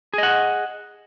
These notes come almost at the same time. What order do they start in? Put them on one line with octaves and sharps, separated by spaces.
G#4 D#5 F#5